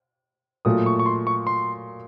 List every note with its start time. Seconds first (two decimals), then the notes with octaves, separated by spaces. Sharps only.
0.65 A#2 F#3 A3 D#6
0.86 C#6
0.99 C#6
1.06 C6
1.27 C#6
1.47 C6